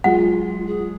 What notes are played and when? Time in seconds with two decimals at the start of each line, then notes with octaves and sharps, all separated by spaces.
0.04 F#3 G#3 F4 F#5
0.66 G#4